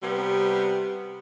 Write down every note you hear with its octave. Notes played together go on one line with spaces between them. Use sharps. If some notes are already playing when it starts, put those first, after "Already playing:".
C3 G3 B3